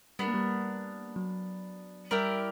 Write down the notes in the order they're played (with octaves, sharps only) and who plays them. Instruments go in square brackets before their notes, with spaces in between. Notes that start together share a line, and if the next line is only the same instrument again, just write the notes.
[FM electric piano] G3 [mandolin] B3 D4 A#4
[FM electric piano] A#3
G3
F#3
[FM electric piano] G3 [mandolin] E4 G4 A#4 D5